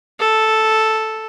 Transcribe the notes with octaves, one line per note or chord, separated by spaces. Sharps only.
A4